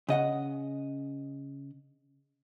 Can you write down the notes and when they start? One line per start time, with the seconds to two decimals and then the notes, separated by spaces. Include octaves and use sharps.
0.09 C#3 D#5 F#5